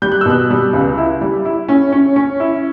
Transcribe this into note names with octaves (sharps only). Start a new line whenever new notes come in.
G3 G6
F#6
E6
B2 F#6
G3
C#2
E4
G3
E4
C#4
C#4
C#4
E4